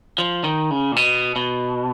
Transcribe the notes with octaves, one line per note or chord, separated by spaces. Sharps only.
F3
D#3
C#3
A#2
B2
B2